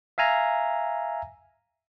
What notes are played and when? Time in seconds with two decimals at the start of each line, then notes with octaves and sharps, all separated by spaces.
0.18 E5 F5 G#5 A#5